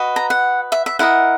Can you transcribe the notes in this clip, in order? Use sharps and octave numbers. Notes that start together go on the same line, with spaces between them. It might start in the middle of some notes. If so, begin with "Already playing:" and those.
Already playing: F#4 B4 D#5
A#5
F#5
E5
E5
E4 A#4 D#5 F#5